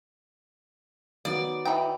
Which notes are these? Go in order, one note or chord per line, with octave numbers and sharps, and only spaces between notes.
D#3 F#3 B3 D5
E3 D#4 G5